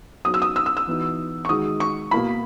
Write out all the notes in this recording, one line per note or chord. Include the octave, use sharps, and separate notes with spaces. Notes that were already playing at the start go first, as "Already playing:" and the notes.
F#3 B3 D#4 F#4 D#6
E6
D#6
E6
E6
E6
E3 B3 D#4 F#4
C#6
D#3 G#3 D#4 F#4 D#6
C#6
B2 A#3 E4 B5